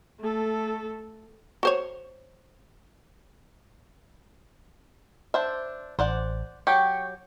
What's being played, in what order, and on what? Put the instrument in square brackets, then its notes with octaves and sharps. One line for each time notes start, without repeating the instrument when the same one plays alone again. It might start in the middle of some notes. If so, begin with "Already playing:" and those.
[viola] A3 A4
[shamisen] F#4 C5 C#5
[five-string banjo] D4 C5 E5
[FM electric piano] A1 [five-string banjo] C5 D5 F#5
[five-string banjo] F#3 G4 [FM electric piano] G5 C#6